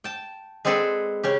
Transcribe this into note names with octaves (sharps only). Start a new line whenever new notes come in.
G5 A5
G#3 C4 G#4 A4 B4 D5
C#3 C#4 G4